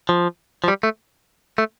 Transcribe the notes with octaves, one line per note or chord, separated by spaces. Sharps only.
F3
F3
G3
A3
A3